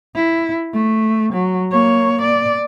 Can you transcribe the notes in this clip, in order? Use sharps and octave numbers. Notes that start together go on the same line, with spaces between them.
E4
A3
F#3
A#3 C#5
D5